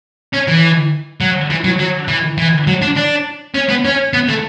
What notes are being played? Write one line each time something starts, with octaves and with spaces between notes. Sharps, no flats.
C#4
E3
F#3
E3
F#3
F#3
E3
E3
F#3
D4
D4
C#4
B3
C#4
B3
A3